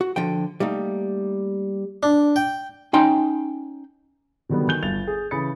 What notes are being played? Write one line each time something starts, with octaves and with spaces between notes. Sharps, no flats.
F#4
D3 F3 G5
G3 A3 A#3 D#4
D4
G5
C#4 D#4 G5 C6
B2 D3 D#3 F#3 G3 B3
D#3 G#5 G6 G7
G1 G2 A6 F7
G#4
C#3 E3 B5 D#6 A6 C#7